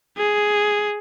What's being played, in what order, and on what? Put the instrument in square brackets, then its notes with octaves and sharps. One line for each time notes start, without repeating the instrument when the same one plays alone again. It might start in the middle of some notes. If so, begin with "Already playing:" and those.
[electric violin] G#4